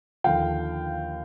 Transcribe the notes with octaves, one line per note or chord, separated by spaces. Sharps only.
D#2 D3 F3 F5 G5